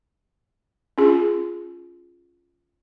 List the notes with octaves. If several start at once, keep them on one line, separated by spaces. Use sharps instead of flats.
C#4 F4 G#4